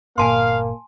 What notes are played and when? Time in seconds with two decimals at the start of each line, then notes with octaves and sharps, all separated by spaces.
0.18 G1 A#2 A#3 F5 G#5 A5 C6